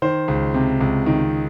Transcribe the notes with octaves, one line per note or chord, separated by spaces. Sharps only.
D#3 C5
C#2
C3
C#2
D#3